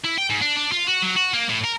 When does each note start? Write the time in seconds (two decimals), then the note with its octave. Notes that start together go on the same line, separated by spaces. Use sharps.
0.05 E4
0.18 G5
0.30 G#2
0.41 D4
0.57 D4
0.72 F4
0.87 F#4
1.02 F#3
1.16 F#4
1.33 A#3
1.49 A2
1.64 A#4